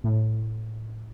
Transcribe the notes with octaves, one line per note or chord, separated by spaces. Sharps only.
A2